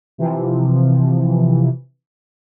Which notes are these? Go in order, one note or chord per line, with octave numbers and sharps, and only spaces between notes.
C3 E3 F3